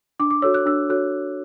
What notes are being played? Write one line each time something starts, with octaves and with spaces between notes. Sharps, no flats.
D4 D6
D6
F#4 A4 C#5 E6
F#6
D4 E6
F#4 A4 C#5 F#6